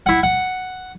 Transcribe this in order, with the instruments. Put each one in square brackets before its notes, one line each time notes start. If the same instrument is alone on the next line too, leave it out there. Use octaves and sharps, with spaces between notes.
[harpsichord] E4 F#5
F#5